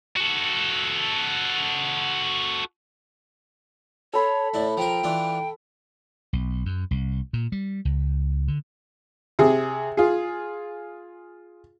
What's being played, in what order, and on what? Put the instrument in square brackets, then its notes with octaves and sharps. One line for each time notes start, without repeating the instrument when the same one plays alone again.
[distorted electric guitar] F#4 A4
[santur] A4 B5 C6 [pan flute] C#5
[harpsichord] A2 E4 [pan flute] D5
[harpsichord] F3 A#4 [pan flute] G5
[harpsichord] E3 D4 F4
[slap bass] B1
F#2
C2
A#2
G3
C#2
D3
[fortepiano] C3 G#4
F4 G#4